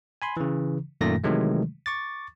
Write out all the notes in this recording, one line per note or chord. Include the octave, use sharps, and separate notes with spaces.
G#5 B5 C6
C#3 E3
F#2 A#2 D#3 A3 A#6
C3 D#3 E3 F#3 G#3 A3
C#6 D6 A6